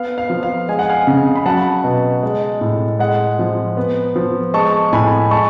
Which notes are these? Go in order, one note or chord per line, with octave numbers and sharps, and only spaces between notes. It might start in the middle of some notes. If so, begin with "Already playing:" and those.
Already playing: B3 F5
F5
F3
F5
G#3 G#5
F#5
F5 G#5
C#3
B5
F#3 F#5 A5
B2
G#3
A2
G#3 F#5
F3
B3
F3
G#3 A5 C#6
A2 G#5 B5
G#3 A5 C#6